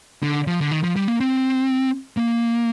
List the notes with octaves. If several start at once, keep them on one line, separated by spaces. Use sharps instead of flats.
D3
F3
D3
D#3
F3
G3
A#3
C4
A#3